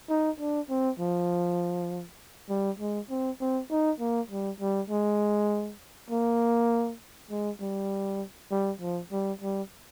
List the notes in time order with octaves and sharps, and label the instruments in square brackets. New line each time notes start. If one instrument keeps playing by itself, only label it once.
[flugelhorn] D#4
D4
C4
F3
G3
G#3
C4
C4
D#4
A#3
G3
G3
G#3
A#3
G#3
G3
G3
F3
G3
G3